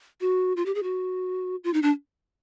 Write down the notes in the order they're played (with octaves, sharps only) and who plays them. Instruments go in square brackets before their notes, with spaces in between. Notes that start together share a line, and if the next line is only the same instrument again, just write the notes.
[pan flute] F#4
F4
G4
G#4
F#4
F4
D#4
D4